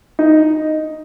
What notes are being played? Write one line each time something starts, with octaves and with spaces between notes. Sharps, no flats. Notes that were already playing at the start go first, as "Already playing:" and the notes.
D#4